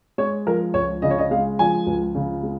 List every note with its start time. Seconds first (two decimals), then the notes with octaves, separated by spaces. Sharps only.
0.18 G#3 C#5
0.46 F3 A#4
0.74 C#2 C#5
1.02 C#3 D#5
1.11 C#5
1.18 D#5
1.31 G#3 F5
1.59 F3 G#5
1.86 C#2
2.15 C#3
2.43 G#3